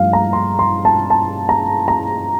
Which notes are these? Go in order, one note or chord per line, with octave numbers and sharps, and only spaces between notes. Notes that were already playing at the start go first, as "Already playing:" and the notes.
Already playing: G2 F3 A3 F5
A#5
C6
C6
A5
A5
A#5
A#5